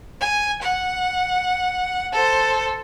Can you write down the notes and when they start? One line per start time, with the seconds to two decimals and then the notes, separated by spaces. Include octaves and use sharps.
0.21 G#5
0.62 F#5
2.13 A4 C5